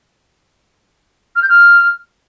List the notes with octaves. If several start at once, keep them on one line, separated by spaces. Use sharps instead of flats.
F6
G6
F6